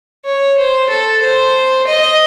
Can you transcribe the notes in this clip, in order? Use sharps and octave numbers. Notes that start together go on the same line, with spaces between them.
C#5
C5
A4
C5
D#5